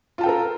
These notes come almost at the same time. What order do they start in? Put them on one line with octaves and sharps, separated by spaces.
F4 A5 G5 A4 A#4